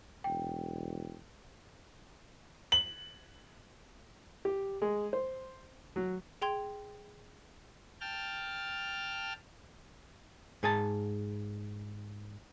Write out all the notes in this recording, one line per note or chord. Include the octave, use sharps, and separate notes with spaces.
E1 G5
F#7
G4
G#3
C5
F#3
G#4 G5 C6 G#6
G5 A5 F6
G#2 G#4 G#5 A5